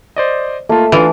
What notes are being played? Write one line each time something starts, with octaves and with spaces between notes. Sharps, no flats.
C5 D5 D#5
A3 A#3 F4
E3 D4 F4